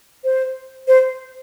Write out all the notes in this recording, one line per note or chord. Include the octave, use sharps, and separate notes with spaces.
C5
C5